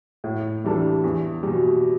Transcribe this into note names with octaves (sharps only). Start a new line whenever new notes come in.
A2
E3 G3 D4 A4
E2
B2 G3